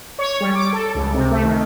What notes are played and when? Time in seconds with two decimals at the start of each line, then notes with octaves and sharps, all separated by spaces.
0.19 C#5
0.40 G3
0.55 D6
0.73 A4
0.95 C#2
1.14 C3
1.31 A3
1.44 D#3